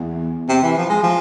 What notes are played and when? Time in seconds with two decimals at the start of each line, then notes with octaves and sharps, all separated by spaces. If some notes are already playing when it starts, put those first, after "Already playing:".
Already playing: E2
0.48 C3
0.62 E3
0.77 F3
0.89 G#3
1.03 F3